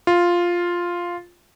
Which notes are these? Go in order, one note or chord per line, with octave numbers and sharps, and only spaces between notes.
F4